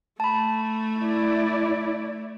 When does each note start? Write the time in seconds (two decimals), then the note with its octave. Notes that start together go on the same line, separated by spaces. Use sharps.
0.20 A3 A5 B5
0.98 E4 D5